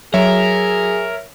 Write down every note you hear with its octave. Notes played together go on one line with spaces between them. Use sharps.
F#3 G#4 A#4 C#5 E5